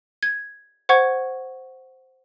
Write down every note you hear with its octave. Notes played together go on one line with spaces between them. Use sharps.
G#6
C5 F#5 C#6 G#6